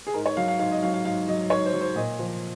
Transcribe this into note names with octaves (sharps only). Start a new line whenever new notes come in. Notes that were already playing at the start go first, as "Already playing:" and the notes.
G#4
G#2 A#4
C#5
F#3 F5
F5
G#2 F5
D#5
F#3 F5
F5
G#2 F5
F#3 D#5
G#2 C#5
C5
F#3
C5
A#2 D#5
F3